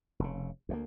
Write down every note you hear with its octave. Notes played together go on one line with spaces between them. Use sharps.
F1 C#3
D2 G#3 A#3